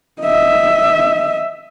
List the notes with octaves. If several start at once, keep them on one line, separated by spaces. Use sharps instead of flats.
D#5 E5